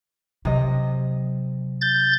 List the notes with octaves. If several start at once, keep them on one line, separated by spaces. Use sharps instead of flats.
C3 F#3 D#5
G6 A6